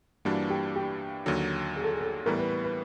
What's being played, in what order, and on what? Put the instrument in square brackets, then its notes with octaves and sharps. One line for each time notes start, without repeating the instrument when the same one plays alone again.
[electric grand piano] G2 E3 G3 A#3 D4 [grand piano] F#4
[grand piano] G4
G4
[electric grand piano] D#2 D3 F#3
[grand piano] G#4
A4
G#4
A4
[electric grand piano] A2 E3 G3 B3 [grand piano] A#4
[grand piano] B4
B4
B4